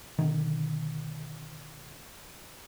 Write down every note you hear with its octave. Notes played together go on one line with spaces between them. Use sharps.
B2 D3 D#3